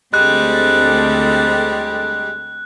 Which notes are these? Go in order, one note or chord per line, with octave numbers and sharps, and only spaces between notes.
D2 G3 G#3 C4 G4 A4 F#6